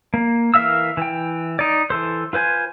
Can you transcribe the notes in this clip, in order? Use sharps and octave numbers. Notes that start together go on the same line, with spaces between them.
A#3
E3 A#4 E5 F5 E6
E3 G5
D#4 D5
E3 A4 C5
F4 B4 C5 G#5